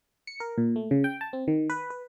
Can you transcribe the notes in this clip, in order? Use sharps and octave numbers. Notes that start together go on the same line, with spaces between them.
C#7
A#4
A#2
A3
C#3
G5
A5
C4
D#3
B4
B4